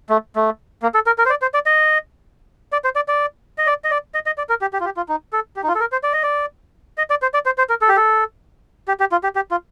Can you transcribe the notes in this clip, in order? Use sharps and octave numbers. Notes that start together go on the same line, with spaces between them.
A3
A3
A#3
A4
A#4
A#4
C5
D5
C5
D5
D#5
D5
C5
D5
D5
D#5
D5
D#5
D5
D#5
D#5
D5
A#4
G4
G4
F4
G4
F4
D#4
A4
G4
D#4
F4
A4
A#4
C5
D5
D#5
D5
D#5
D5
C5
D5
C5
C5
A#4
A4
G4
A4
G4
G4
F4
G4
G4
F4